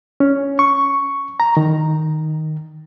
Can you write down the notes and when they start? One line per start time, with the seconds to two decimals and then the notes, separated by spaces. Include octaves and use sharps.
0.20 C#4
0.59 C#6
1.40 A#5
1.57 D#3